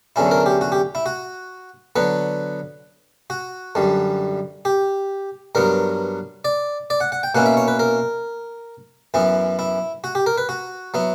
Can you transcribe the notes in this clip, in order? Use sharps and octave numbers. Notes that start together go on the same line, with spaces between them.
E2 D3 F#3 C#4 E4
A#4
G4
F#4
G4
E4
F#4
D3 F#3 B3 B4
F#4
F#2 D3 G3
G4
G2 F#3 B3 A#4
D5
D5
F#5
F#5
G5
B2 A#3 C#4 E4 F#5
E5
C#5
B4
A#4
F#2 E3 B3 E4
E4
F#4
G4
A#4
B4
F#4
F#3 B3 E4